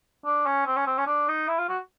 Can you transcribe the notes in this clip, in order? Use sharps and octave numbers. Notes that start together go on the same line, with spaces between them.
D4
C#4
C4
C#4
C4
C#4
D4
D#4
E4
F4
F#4